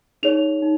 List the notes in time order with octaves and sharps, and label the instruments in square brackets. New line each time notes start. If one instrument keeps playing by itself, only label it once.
[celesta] D#4 G#4 C#5 F7
D#4